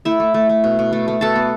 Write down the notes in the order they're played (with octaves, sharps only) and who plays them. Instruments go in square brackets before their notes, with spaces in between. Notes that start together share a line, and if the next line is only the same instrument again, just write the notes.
[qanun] A3 E4 E5
A3
A3
A3
B2
B2
A3
A3
B2 A4 A5
B3